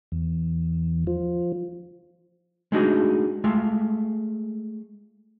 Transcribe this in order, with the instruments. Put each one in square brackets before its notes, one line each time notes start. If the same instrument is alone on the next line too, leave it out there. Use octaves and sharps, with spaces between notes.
[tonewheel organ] E2
F3
[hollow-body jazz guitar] G#3 A3 D4 D#4 F#4 G#4
G#3 A3 F4